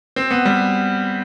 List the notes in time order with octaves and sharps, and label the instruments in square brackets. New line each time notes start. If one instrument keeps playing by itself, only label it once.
[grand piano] C4
B3
G3